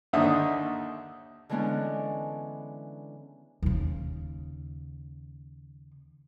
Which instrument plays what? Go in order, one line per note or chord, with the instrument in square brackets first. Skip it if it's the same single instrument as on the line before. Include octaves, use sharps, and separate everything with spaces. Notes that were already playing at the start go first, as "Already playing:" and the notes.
[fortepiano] D#2 D3 D#4 E5 D#6
[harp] D3 E3 G#3 B3 C#4 D4
[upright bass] D#2 C#3